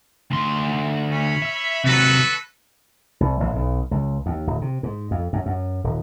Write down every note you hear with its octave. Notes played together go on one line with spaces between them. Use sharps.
D2 C6
C#4 B5
E5
C3 F#3 F#4 A4 B4
C2
A1
B1
C#2
D#2
D1
C3
G#2
F2
F#2
F#2
D#1